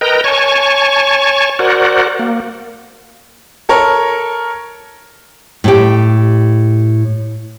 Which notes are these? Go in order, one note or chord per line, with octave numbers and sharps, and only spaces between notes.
A#4 B4 D#5 G5 A#5
C#5 G#5 A5 C#6
F#4 A#4 C5 D5 F#5
A#3
A4 A#4 C#5
A2 G4